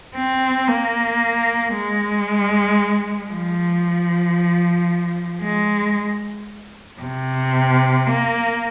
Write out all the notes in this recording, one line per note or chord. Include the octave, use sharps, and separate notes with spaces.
C4
A#3
G#3
F3
G#3
C3
A#3